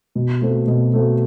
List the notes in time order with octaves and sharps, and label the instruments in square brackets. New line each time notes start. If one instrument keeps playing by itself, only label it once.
[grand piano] B2
A3 C4 F#4
B2
A3 C4 F#4